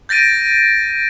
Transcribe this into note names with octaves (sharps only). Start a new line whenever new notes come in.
G6 A6 A#6 D7 D#7